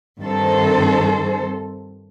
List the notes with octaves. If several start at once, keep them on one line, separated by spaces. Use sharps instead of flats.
G2 D#3 C4 A4 C5